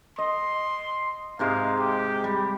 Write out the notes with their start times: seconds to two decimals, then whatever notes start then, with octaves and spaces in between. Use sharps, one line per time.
0.18 D#5 C6
1.39 G#2 C3 G#3 F5
1.78 G4
2.24 G3